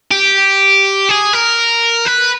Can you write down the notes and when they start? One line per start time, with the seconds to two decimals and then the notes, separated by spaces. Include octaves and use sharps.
0.11 G4
1.09 G#4
1.33 A#4
2.06 B4